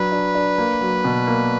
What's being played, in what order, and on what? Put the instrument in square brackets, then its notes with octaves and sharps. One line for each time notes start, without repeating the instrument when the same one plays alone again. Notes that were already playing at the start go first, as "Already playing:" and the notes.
Already playing: [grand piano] F#3 D4 [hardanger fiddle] B4
[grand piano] D4
D4
A#3
F#3
B2
A#3